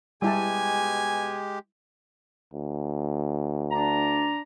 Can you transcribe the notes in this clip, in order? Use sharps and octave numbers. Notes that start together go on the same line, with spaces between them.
B2 G3 G#3 E4 G4 G#5 A5
D2
D4 A#5